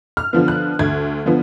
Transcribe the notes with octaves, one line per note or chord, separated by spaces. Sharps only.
F6
D3 F3 B3
F#6
D2 G#6
D3 F3 B3